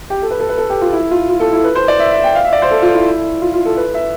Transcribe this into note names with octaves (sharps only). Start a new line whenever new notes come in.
G4
A4
B4
A4
B4
A4
G4
F4
E4
F4
F4
A4
E4
B4
C5
D5
E5
E5
G5
F5
E5
D5
C5
A4
F4
E4
F4
F4
A4
B4
E5